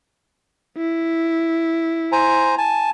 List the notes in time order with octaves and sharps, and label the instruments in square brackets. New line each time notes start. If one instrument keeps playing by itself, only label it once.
[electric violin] E4
[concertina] C5 G#5 A#5
G#5 A5